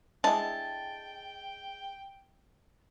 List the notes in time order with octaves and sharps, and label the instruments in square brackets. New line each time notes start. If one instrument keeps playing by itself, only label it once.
[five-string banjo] G#3 E4 A4 [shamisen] D4 G#4 [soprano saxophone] G5 [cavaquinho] A5